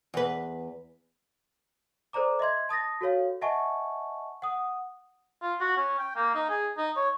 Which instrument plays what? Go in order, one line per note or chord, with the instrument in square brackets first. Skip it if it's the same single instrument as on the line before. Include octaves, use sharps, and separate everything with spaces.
[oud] E2 B4
[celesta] A4 C5 D5 A#5 D6
D#5 E5 C6 G#6
A5 D#6 A6 A#6
F#4 A4 C#5 F5
D#5 E5 F#5 G#5 A5 C#6
F#5 D#6
[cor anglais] F4
F#4
C#4
G5
A#3
D#4
G#4
D#4
C#5